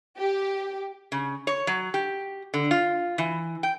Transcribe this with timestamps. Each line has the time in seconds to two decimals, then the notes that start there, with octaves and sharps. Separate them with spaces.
0.18 G4
1.12 C#3
1.47 C#5
1.67 F#3
1.94 G4
2.54 D3
2.71 F4
3.18 E3
3.63 G5